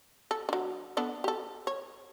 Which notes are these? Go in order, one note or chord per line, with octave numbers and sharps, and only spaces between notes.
A4
F#3 D4
B3 D4 A4
G4 A4
C#5